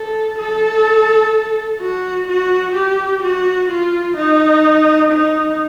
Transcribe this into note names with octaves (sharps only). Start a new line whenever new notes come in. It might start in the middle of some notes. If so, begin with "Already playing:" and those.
Already playing: A4
A4
F#4
F#4
G4
F#4
F4
D#4
D#4